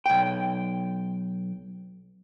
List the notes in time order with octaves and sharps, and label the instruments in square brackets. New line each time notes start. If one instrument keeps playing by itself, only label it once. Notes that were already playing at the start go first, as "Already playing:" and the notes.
[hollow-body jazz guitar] B1 G5